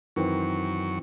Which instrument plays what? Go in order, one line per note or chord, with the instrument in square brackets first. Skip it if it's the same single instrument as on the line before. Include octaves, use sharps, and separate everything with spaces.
[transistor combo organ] F#2 C#6 [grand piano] D#3 E3 C4